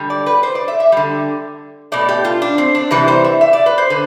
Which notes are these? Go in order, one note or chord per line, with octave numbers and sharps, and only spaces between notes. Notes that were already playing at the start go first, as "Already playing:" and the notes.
Already playing: D3 G3
D5
B4
C5
D5
E5
E5
D3 G3
B2 A3 D5
G4
F4
D4
C4
D4
C3 E3 G3 B4
C5
E5
E5
D5
B4
C5
D3 B4